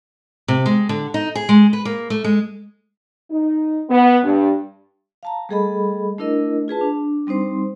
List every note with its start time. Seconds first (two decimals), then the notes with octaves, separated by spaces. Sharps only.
0.48 C3
0.66 G#3
0.89 D3
1.14 D#4
1.35 G#4
1.49 G#3
1.73 B4
1.85 A#3
2.10 A3
2.24 G#3
3.31 D#4
3.90 B3
4.23 G2
5.23 F5 A5 A#5
5.49 G3 A3 G#4 A4 D#5 B5
6.18 A3 D4 E4 A#4 D#5
6.68 F4 G#4 B4 A5
6.81 D4
7.27 G3 C4 D#4 C5 C6